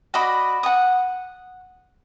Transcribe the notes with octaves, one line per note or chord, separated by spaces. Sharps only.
F#4 D5 D#5 B5
F#5 D#6